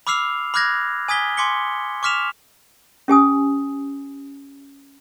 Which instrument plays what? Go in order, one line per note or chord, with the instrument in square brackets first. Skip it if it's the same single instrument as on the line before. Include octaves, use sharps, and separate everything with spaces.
[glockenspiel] B5 D6 E6 F6 C7 F7
B5 D6 F6 F#6 G#6 A#6
G#5 D#6 G#6 B6 G7
G#5 C6 D6 B6 C#7 G7
C#6 D6 F6 B6 E7 F7
[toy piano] C#4 G4 G#5 D#6